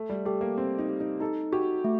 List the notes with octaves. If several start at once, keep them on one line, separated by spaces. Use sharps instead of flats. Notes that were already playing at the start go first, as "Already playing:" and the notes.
Already playing: A3
G3
A3 G4
A#3
C4 G4
D#4
G4
D#4
D#4 A4
F#4 G4
A3